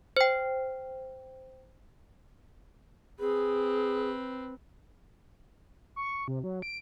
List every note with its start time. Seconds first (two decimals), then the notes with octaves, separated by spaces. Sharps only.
0.17 C5 G5
3.20 C4 G#4 B4
5.96 C#6
6.28 C3
6.44 F#3
6.62 D7